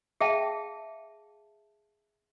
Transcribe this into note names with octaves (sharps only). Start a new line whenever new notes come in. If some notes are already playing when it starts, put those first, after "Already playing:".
G#4 E5 F5 G5 A5